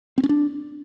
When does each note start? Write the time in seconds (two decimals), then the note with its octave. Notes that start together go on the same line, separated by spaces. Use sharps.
0.18 C4
0.24 C#4
0.29 D4